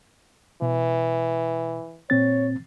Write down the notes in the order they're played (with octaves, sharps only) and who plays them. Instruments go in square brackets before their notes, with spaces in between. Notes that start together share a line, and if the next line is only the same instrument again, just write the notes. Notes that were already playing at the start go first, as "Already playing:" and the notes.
[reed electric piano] B2 [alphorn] E3
[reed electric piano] A#2 C4 A6 [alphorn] C#5